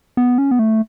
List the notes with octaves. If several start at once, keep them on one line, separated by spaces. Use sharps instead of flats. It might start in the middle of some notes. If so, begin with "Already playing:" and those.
B3
C#4
B3
A3